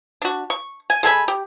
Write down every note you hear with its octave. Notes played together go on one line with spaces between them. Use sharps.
D4 F#4
C#6
G#5
G#3 A4 G#5 B5
G4